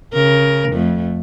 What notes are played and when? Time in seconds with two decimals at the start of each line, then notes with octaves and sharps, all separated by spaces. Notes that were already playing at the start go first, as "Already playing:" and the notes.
0.13 C#3 A#4
0.73 F2 A3